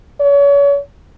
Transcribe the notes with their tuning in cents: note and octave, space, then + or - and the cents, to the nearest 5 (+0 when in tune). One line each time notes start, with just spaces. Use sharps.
C#5 +35